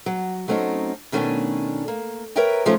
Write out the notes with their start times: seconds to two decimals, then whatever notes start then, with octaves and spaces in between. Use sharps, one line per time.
0.06 F#3
0.48 F#3 A3 C4 C#4 D#4
1.12 B2 D#3 A3 C#4 D4 G#5
1.88 A#3
2.36 A#4 B4 C#5 E5 G5 A#5
2.66 D#3 F3 G#3 A3 C#4